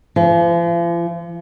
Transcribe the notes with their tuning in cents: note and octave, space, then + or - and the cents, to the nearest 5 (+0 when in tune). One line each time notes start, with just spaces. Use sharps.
F3 -45